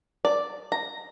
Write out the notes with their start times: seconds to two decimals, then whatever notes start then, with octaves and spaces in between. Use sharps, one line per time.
0.25 D5
0.72 A#5